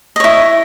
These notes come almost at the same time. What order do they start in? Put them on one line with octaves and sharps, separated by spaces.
D#5 C#5 E4